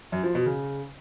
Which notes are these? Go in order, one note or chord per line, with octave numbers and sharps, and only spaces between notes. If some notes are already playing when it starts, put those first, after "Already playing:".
F#2
F3
B2
C#3